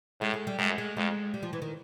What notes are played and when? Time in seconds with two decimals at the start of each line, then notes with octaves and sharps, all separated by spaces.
0.21 A2 G#3
0.34 G#3
0.47 G3
0.58 F#2 G#3
0.78 G#3
0.97 F2 G#3
1.34 G3
1.43 F3
1.53 E3
1.62 D#3